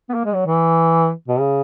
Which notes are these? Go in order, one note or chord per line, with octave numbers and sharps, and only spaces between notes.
B3
A#3
G#3
F#3
E3
B2
C#3